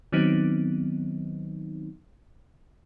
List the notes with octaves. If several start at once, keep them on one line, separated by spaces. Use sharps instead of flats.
D#3 F#3 B3 C4 D#4